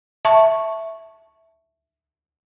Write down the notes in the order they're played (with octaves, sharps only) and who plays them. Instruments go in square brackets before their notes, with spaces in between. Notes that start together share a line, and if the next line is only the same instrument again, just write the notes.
[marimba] E5 A5 C#6